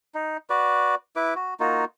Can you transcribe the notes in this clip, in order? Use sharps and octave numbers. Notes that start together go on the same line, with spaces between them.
D#4
F#4 B4 D5
E4 B4 D6
F#4
A#3 D#4 F4 F#4